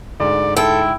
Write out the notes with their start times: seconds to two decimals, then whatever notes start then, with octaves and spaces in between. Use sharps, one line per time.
0.20 D2 G#2 D5
0.56 E4 A4 G5